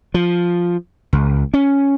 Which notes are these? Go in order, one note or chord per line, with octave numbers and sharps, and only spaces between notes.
F3
C#2
C#4